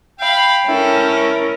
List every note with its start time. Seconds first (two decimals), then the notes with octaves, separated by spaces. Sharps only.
0.20 F5 G5 B5
0.68 C#4 E4 A4 A#4